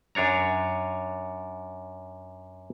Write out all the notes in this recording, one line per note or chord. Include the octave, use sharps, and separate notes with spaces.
F#2 D4 C#5 A#5